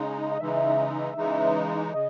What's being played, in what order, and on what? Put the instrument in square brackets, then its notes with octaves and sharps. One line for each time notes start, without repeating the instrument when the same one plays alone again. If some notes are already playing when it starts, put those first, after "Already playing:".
Already playing: [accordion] C#3 G#3 D#4
[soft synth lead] D#5
[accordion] C#3 E3 G#3 D#4 [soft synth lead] E5
[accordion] C#3 E3 G#3 D#4
[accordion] C#3 [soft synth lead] D#5